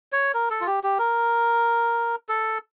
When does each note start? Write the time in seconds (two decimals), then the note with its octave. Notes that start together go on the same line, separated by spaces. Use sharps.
0.12 C#5
0.34 A#4
0.51 A4
0.61 F4
0.67 G4
0.84 G4
0.99 A#4
2.29 A4